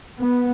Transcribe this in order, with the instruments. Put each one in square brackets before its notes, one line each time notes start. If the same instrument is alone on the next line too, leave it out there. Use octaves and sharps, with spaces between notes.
[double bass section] B3